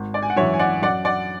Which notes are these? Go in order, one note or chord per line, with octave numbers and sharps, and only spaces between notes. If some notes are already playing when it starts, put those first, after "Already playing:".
Already playing: G#1
D5
G#5
F#5
F#2 E3 C#5 E5
G#5
D5 F#5
F#2 D5 F#5
D5 F#5